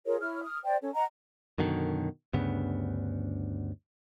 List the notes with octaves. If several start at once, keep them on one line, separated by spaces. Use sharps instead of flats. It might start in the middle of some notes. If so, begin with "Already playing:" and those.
F4 G#4 A#4 C#5
E4 C#5 F6
D#6 F6
C5 D5 G5
C#4 A4 C#5
D#5 F#5 A#5
F#2 B2 D3 D#3
D2 G2 C#3 B3